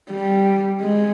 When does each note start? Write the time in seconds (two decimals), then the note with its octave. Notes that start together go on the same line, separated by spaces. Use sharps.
0.10 G3
0.81 G#3